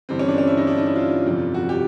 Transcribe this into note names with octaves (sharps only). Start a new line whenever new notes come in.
G1 G2 E3 C4
C#4
D4
C#4
E4
D#4
D4
D#4
E4
F4
G1 F2 C3 F3
F#4
G4